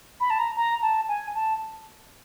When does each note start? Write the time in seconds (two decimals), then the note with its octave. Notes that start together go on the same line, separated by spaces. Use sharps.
0.20 B5
0.30 A5
0.39 A#5
0.56 A#5
0.82 A5
1.08 G#5
1.35 A5